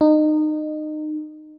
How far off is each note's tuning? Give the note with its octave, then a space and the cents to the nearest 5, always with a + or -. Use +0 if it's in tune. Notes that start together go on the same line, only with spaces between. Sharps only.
D#4 -25